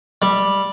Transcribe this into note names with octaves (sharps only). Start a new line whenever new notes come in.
G3